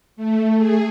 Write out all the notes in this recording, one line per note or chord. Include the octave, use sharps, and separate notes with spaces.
A3
G#4